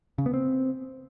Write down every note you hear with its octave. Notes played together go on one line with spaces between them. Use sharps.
C#3
B3
C4